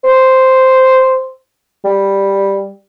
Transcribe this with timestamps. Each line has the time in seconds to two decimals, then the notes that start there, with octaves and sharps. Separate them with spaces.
0.04 C5
1.84 G3